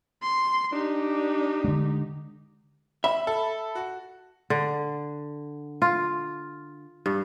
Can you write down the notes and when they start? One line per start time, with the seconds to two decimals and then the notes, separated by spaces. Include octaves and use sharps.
0.22 C6
0.73 D4 D#4 G4
1.64 D3 G#3
3.04 E5 B5
3.27 A4
3.75 F#4
4.50 D3
5.82 F4
7.06 G2